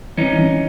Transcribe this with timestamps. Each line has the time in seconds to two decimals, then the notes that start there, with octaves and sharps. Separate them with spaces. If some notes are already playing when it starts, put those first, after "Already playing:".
0.17 E3 C#4 D#4
0.38 E3